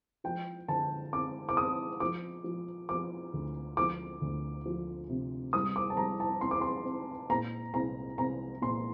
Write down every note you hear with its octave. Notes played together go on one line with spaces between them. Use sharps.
F3 G5
D3 A5
C4 D6
D6
C4 D#6
F3 D6
F3
F3 D6
D2
F3 D6
D2
F3
C3
G3 D#6
D6
A5
G3 A#5
A5
C4 C6
D6
C6
C4
A#2 A#5
C2 A#5
C2 A#5
A#2 C6